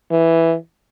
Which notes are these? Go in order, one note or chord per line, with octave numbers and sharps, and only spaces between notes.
E3